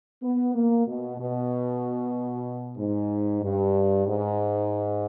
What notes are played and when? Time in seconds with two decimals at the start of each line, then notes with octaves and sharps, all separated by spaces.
0.22 B3
0.54 A#3
0.86 B2
1.18 B2
2.78 G#2
3.42 G2
4.06 G#2